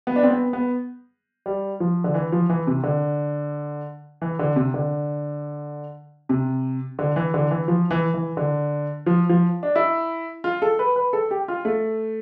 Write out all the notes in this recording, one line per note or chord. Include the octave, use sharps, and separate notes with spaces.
B3
D4
C4
B3
B3
G3
F3
D3
E3
F3
E3
C3
D3
E3
D3
C3
D3
C3
D3
E3
D3
E3
F3
E3
E3
D3
F3
F3
D4
E4
F4
A4
B4
B4
A4
G4
F4
A3